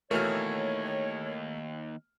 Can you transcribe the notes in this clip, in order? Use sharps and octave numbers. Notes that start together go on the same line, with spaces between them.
D#2 B2 E3 A3 A#3 C#5 F6